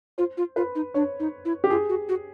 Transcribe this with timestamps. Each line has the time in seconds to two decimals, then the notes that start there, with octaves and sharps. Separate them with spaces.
0.18 F4 C5
0.37 F4
0.56 F4 B4
0.75 D#4
0.94 D4 C#5
1.20 D#4
1.45 E4
1.64 G4
1.70 F4 G#4
1.89 F#4
2.09 F#4